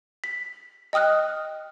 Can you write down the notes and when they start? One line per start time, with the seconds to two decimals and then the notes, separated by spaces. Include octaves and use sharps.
0.24 B6
0.93 D#5 G5 D#6 F6 F#6